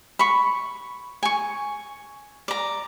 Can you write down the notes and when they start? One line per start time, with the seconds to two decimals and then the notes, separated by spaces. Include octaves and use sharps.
0.19 B5 C#6
1.23 G#5 C#6
2.48 D5 A#5